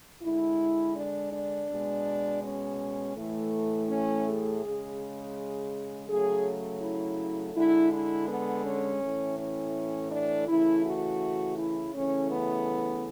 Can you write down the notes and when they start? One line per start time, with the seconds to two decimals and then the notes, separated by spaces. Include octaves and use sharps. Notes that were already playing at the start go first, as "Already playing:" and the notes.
0.22 D3 G#3 E4
0.96 D4
1.32 D4
1.69 B2 G#3
2.43 C#4
3.16 A2 E3 A3
3.89 C#4
4.26 G#4
4.63 C#3 G#3
6.08 C#3 F#3 A3 G#4
6.82 E4
7.55 D3 G#3 E4
7.92 E4
8.29 B3
8.65 C#4
9.02 A2 E3 A3
9.39 C#4
10.11 D4
10.48 C#3 E3 A3 E4
10.85 F#4
11.58 E4
11.94 C#3 E3 A3 C#4
12.31 B3